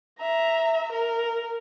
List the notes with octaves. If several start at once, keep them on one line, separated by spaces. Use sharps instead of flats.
E5 A#5
A#4